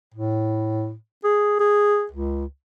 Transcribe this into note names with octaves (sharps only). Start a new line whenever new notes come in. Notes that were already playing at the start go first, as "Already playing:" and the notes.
A2
G#4
G#4
C#2